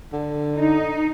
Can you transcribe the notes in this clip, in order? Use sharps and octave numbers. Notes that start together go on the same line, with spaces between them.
D3
D#4